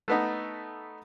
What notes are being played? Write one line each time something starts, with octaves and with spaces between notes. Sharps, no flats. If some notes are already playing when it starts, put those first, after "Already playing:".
A3 B3 D#4